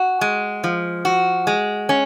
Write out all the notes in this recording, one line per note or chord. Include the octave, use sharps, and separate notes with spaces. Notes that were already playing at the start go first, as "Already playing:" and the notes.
Already playing: F#4
G#3
F3
F#4
G#3
C#4